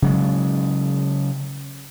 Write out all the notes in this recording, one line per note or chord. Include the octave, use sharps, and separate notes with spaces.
C#3 F#3 G#3